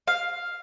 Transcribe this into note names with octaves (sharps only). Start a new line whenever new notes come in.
F5